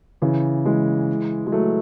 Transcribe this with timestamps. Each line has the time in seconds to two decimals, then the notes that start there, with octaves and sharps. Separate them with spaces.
0.22 C#3 E3
0.65 E3 G#3
1.47 G#3
1.52 F#3 A3